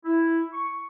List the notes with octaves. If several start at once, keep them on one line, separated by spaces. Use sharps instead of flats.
E4
C#6